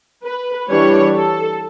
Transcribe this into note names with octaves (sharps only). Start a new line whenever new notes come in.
B4
E3 G3 D4 C#5
A4